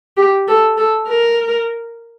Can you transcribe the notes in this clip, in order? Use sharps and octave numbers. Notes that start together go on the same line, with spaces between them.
G4
A4
A4
A#4